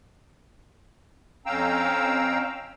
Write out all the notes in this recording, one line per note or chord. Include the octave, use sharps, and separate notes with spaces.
F2 C#4 F5 G5 A#5 E6